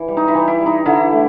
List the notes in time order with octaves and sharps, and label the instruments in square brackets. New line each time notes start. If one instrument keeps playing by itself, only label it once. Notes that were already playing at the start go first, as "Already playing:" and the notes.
Already playing: [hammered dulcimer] E3
G3
D#4
E4
E3
E4
G3
D#4
D3 E4
A3